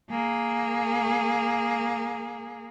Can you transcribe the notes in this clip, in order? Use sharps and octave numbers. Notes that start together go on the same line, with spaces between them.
A#3 G#4